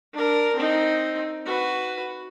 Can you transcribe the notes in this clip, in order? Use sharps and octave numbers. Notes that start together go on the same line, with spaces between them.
D4 A#4
C4 D#4
F#4 B4